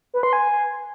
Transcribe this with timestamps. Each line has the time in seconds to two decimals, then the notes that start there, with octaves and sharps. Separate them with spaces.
0.14 B4
0.23 C6
0.33 G#5